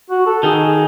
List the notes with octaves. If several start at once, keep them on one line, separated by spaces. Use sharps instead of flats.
F#4
A4
D#3 G#4